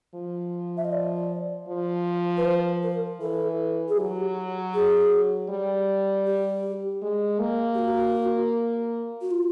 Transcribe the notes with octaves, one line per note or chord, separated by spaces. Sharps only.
F3
E5
D#5
D5
F3
B4
C5
A#4
E3 A4
G#4
F#3 G4
G#4
G3
G4
G#3
A#3
G4
F#4
F#4
F4